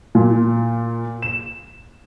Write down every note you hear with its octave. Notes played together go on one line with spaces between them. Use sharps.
A#2
E7